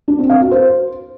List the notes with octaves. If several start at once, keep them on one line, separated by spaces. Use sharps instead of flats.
D4
C4
F5
F#4
C5